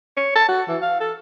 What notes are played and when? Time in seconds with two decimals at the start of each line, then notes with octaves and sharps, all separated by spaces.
0.17 C#5
0.36 A5
0.49 F#4
0.69 E3
0.82 F5
1.01 A4